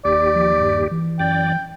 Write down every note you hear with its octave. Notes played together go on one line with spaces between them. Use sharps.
F1 D#2 G4 D5
F3
G2
E3
F#2 D5 G5